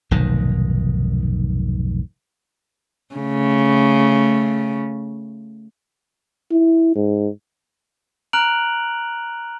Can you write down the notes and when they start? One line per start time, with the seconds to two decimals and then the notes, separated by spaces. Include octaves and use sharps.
0.11 F1 B1 G#2 D#3
3.15 C#3 A3
6.51 E4
6.95 G#2
8.33 A#5 F6 F#6 D7 F7 F#7